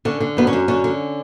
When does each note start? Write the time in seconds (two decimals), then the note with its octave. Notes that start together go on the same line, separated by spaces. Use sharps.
0.05 D3 C#4
0.20 D3
0.37 F#2 B3
0.47 C#4
0.53 F#2
0.68 D3 C#4
0.84 D3